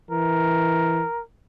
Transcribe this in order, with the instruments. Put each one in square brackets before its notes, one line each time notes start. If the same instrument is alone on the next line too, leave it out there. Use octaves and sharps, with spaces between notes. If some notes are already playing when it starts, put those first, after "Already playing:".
[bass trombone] E3 [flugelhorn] A#4